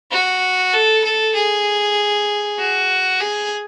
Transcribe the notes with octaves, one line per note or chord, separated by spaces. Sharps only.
F#4
A4
A4
G#4
F#4
G#4